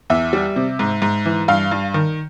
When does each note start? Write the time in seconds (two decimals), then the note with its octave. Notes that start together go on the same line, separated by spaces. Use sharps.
0.10 E2 E5
0.33 G3
0.56 C3
0.79 G#2
1.02 G#2
1.25 E3
1.48 G2 F5
1.71 G2
1.94 D#3